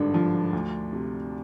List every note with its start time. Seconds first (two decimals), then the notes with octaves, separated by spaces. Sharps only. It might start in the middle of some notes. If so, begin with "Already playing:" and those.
Already playing: G#1 G2 D3 D4
0.14 F3
0.53 D2
0.93 C3